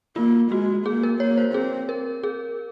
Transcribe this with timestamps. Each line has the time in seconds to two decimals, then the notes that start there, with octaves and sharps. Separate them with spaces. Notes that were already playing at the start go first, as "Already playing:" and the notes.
0.16 A#3 F4
0.51 G#3 F#4
0.86 A#3 G#4
1.03 A#4
1.20 A#3 C#5
1.37 C5
1.54 C4 G#4
1.89 A#4
2.23 G#4